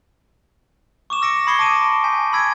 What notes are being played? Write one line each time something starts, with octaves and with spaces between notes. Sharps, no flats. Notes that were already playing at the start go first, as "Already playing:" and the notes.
C#6 D6 E7
E6 A#6 C#7 D7
B5 D#6 G#6 C7 C#7 G7
A5 D6 A#6 D7 D#7
G#5 G6 B6
B5 E6 G#6 B6 D7